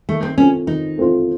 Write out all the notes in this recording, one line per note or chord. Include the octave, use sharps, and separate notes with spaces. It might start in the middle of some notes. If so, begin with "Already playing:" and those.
D#3 A3
C4
A3 C4 C#4 F4
D#3 D#4
A3 C4 F4